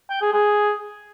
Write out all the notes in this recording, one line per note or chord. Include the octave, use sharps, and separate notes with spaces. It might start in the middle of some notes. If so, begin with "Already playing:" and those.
G5
G#4
G#4